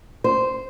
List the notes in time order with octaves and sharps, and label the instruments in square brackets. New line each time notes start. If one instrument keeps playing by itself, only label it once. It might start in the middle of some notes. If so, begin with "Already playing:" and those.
[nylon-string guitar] C5